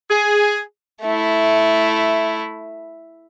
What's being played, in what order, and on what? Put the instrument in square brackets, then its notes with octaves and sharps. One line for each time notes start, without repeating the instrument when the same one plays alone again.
[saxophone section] G#4
[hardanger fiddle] A3 E4